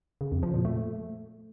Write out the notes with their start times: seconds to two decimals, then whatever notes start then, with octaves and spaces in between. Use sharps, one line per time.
0.21 C#3
0.32 F2
0.43 F3
0.54 A#2
0.65 A3